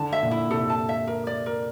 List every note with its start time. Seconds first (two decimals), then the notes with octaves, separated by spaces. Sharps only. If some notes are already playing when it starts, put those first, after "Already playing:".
Already playing: D3 A5
0.13 E5
0.23 A#2
0.31 E4
0.50 C3 A4
0.70 A5
0.89 E5
1.07 A#4
1.27 D5
1.46 A#4